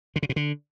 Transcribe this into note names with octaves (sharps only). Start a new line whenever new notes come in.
D3
C#3
B2
D3